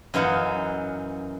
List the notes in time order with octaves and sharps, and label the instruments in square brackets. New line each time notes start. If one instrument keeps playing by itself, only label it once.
[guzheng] F#2 E3 D#4 F5 F#5